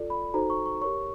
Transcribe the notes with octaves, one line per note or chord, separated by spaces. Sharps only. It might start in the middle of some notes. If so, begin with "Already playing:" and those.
Already playing: F4 A4 D5
B5
D#4 F#4 A4 C5 A#5
C#6
C#6
G4 A#4 C#5 C#6